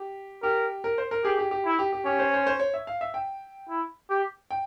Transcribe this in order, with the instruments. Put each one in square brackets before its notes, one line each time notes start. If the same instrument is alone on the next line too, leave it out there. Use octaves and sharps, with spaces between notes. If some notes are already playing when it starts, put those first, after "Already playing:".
Already playing: [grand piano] G4
[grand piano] G4 [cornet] A#4
[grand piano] A#4
C5
A#4
[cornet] G4 [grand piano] G#4
[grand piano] G4
G4
[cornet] E4
[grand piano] G4
G4
[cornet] C#4 [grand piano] G4
[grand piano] C5
C5
C5
C#5
E5
F5
E5
G5
[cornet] E4
G4
[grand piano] G5